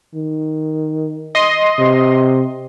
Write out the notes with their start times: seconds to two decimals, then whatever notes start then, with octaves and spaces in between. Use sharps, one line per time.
0.15 D#3
1.35 D#5 C6
1.79 C3